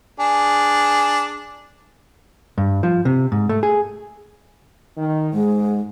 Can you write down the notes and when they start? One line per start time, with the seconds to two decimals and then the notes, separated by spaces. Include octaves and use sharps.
0.20 D4 G#4
2.58 G2
2.83 F3
3.05 C3
3.32 G#2
3.49 A3
3.63 G#4
4.97 D#3
5.33 G#2 G#3